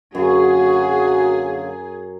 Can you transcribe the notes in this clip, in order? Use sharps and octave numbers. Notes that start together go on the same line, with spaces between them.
F#2 D3 F#3 A#3 F#4 G#4